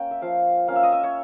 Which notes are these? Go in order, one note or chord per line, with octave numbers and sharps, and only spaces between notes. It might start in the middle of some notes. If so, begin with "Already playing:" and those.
Already playing: A#3 C#4 G5
E5
F3 F5
A#3 C#4 F5
E5
D#5
E5
C#5